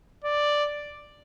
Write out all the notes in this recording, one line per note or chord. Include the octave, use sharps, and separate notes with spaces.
D5